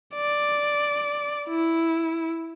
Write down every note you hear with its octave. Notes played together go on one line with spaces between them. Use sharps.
D5
E4